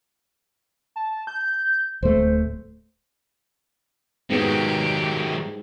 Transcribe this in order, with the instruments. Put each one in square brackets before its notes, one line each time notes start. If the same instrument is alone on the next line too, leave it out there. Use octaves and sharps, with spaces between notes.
[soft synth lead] A5
G6
[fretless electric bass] D1 A3 [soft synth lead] C5
[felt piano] G#2 B3 [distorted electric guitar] D#3 F#3 [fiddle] G4